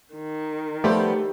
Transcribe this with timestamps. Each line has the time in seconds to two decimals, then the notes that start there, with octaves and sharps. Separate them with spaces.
0.15 D#3
0.84 F3 G3 A3 B3 G4